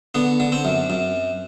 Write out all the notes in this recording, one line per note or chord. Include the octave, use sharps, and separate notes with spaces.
D3 B3
D3
C4
F#2
F#2